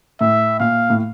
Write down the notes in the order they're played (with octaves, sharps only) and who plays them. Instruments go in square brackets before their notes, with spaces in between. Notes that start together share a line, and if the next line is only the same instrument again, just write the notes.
[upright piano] A2 [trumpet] E5
[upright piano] A#2 [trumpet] F5
[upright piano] A2